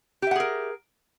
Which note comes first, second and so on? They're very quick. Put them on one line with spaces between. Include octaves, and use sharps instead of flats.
G4 E5 F#5 G#4 A#4